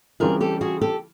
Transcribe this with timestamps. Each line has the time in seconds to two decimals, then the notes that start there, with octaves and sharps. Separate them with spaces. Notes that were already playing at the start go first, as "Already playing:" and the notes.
0.20 C#3 E3 G3 C4 F4 G#4 A#4
0.41 G4 A4
0.61 F#4 G#4
0.81 G4 A4